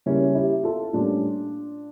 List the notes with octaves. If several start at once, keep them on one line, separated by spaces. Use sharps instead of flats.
C#3 G3 A#3 C#4 E4
E4 G4
F4 A4
A2 G3 A#3 C#4 D4 F4